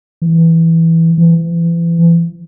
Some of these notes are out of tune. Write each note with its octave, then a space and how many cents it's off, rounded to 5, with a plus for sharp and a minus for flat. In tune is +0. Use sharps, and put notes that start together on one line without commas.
E3 -5
E3 +35